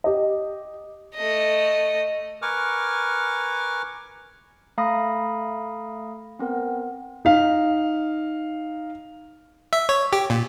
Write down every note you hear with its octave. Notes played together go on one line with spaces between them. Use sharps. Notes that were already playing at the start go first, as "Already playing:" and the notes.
G4 D#5
A3 D#5
A#4 B4 G#5 C#6 D6 F6
A3 F5 A#5 B5 D#6 A#6
B3 C4 A#4 F#5
D#4 F5
E5
C#5
G4
A#2